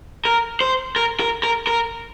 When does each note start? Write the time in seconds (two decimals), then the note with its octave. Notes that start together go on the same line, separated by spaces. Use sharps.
0.25 A#4
0.61 C5
0.96 A#4
1.20 A#4
1.43 A#4
1.67 A#4